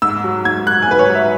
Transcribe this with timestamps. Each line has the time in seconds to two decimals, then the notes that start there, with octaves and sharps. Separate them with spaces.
0.02 G#2 E6
0.24 F#3
0.45 G#2 G#6
0.67 F#3 F#6
0.82 G#5
0.88 G#2 B4
0.99 C#5
1.09 F#3
1.15 E5